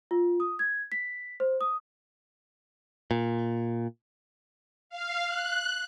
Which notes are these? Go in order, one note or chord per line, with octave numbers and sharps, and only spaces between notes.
F4
D#6
G#6
B6
C5
D#6
A#2
F5
F#6